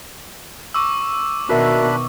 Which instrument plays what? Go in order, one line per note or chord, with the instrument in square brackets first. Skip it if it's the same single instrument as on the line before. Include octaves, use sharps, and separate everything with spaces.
[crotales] C#6 D6 E6
[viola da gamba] B2 D#3 [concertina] D4 B5 F#6 [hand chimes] F#4 A#4 E5